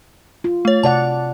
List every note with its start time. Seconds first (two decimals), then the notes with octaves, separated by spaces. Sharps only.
0.44 F4
0.65 A3 C#5
0.83 C3 D5 F#5 A5